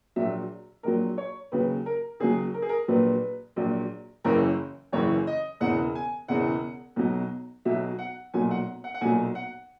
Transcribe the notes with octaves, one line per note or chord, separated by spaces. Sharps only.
A#1 A#2 F#3 E5
A#1 A#2 F#3 A#4
C#5
D#2 C#3 F#3 B4
A#4
D#2 C#3 F#3 G#4
A#4
G#4
A#4
A#1 A#2 F#3 B4
A#1 A#2 F#3
F#1 F#2 C#3 E3 A#4
F#1 F#2 C#3 E3 C#5
D#5
E1 E2 C#3 E3 F#5
G#5
E1 E2 C#3 E3 F#5
B1 B2 F#3
B1 B2 F#3 E5
F#5
B1 A#2 F#3 G#5
F#5
F#5
F#5
B1 A#2 F#3 G#5
F#5